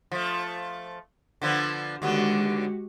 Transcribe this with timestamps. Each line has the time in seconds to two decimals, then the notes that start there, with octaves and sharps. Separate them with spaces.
0.12 F3 A3
1.42 D3 F3 B3
2.02 D#2 D3 G#3 B3 F#4 G4